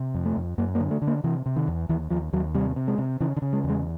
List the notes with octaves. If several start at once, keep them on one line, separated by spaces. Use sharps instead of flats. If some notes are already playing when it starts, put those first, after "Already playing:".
Already playing: C3
F2
A3
F2
F#2 A#3
A#3
D3
A3
D3
A#3
C3 E3
C3
D#3
E2
D#2 E3
D#2 F3
D#2 F#3
C3 G3
C3
G#3
C3
C#3 E3
D3
C#3
G#3
E2
G#3